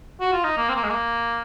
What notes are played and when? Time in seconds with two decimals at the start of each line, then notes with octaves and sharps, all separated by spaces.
0.21 F#4
0.33 F4
0.44 D#4
0.58 A#3
0.69 C4
0.76 A#3
0.83 G#3
0.90 A#3